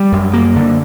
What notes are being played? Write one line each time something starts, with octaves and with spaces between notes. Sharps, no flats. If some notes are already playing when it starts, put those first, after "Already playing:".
Already playing: G3
F#2
A#3
D3